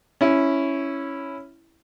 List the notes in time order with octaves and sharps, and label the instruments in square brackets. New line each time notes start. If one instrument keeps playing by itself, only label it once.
[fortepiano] C#4 E4